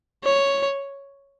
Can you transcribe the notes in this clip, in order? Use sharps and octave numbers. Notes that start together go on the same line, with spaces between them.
C#5